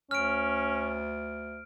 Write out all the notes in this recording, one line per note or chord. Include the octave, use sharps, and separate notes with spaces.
D2 C#4 F6 D7